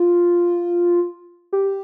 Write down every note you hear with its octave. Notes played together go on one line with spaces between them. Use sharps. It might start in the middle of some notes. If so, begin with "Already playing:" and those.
Already playing: F4
G4